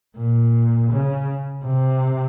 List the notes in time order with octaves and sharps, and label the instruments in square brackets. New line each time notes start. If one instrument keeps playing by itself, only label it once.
[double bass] A#2
C#3
C3